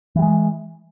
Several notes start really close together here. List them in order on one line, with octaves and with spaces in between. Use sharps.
E3 G3 G#3